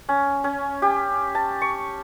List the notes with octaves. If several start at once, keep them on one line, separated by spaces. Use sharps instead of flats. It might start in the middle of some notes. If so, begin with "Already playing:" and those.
C#4
C#4
G4
A5
C#6